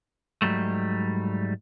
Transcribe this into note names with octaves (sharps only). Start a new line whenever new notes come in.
G#2 C3 F#3 G3 A3